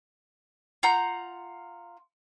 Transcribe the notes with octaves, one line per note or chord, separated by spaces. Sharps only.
F4 F#5 A#5 G6